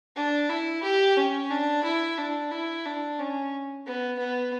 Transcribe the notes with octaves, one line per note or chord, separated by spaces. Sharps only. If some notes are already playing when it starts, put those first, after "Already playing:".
D4
E4
G4
C#4
D4
E4
D4
E4
D4
C#4
B3
B3